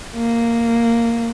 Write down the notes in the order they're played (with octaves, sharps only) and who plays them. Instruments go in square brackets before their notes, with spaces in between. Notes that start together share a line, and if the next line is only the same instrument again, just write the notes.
[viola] A#3